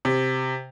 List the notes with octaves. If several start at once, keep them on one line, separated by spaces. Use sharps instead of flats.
C3